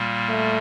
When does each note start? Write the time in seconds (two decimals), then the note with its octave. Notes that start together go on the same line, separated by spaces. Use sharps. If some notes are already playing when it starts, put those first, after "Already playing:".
Already playing: A#2 G3 A#3
0.30 A3